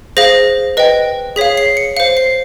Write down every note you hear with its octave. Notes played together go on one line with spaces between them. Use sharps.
G#4 C5 F5 A#6
B4 D#5 G5
G#4 C#5 F5 B6
C7
C#7
C5 F5 C#7
C7